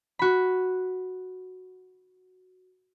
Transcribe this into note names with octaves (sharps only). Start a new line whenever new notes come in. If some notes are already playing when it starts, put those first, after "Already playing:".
F#4 B5